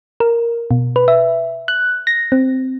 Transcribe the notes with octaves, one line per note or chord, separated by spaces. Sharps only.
A#4
B2
B4
E5
F#6
A#6
C4